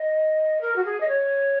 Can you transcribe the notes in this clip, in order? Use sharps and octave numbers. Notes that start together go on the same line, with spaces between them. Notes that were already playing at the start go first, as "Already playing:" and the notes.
Already playing: D#5
A#4
F#4
G#4
D#5
C#5